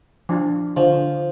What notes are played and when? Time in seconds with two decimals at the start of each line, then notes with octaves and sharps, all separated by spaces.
0.29 F3 D4 F4
0.77 D3 F3